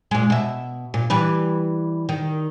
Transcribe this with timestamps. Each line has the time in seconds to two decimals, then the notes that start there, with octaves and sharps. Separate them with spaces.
0.11 A#2 G#3
0.30 B2 E5
0.94 A#2
1.10 E3 G3 B4
2.09 D#3